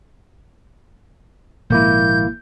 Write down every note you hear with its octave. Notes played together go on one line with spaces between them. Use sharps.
G#1 A#2 F3 G#3 A#3 E4 G6